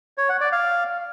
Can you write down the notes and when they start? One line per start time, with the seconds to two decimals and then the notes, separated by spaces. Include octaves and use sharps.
0.18 C#5
0.29 F#5
0.41 D5
0.52 F5